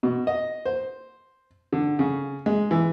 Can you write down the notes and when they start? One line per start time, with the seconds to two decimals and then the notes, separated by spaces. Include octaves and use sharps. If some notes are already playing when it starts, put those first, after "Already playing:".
0.03 B2
0.27 D#5
0.65 C5
1.73 D3
1.99 C#3
2.46 G#3
2.71 E3